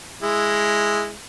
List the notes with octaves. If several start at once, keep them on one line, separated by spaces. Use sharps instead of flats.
G#3 E4